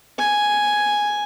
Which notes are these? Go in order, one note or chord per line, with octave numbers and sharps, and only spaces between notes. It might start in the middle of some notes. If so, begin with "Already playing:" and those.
G#5